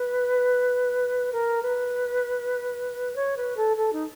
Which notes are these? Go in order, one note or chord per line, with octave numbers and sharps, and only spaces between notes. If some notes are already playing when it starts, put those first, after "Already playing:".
Already playing: B4
A#4
B4
C#5
B4
A4
A4
D#4